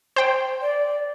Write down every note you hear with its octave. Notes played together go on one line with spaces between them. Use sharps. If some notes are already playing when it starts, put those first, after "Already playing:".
C5 G5
D5